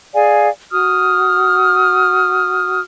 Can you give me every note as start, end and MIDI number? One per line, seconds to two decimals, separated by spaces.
0.15 0.49 68
0.15 0.49 74
0.15 0.49 77
0.15 0.49 80
0.72 2.81 66
0.72 2.81 87
0.72 2.81 89